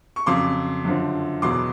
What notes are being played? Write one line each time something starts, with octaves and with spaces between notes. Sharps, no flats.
C#6
F2 C#3 F#3 C6 D6
F#2 D3 F3
E2 B2 F#3 C6 D6